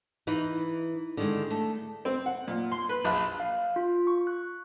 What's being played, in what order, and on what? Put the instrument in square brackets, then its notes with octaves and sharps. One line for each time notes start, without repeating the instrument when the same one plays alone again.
[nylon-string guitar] E3 D#4 B4 D#5
D3 D#3 G#3
A3
[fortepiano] C4
F#5
A#2
C6
B4
A#1
[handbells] F5
F4
C#6
F#6